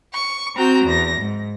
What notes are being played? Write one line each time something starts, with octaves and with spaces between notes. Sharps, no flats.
C#6
C4 F#4 A#5 G6
E2 A#6
G#2